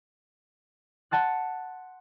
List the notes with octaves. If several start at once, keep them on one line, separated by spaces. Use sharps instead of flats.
F#5 A5 C6 F#6